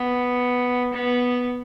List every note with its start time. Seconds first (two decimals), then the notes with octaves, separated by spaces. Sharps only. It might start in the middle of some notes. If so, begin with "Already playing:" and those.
Already playing: B3
0.93 B3